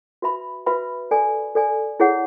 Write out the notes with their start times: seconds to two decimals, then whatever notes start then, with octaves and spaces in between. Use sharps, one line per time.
0.22 F#4 B4 E5 B5
0.66 F#4 B4 E5 B5
1.11 A4 D5 G#5
1.55 A4 D5 G#5
2.00 E4 G#4 C#5 F#5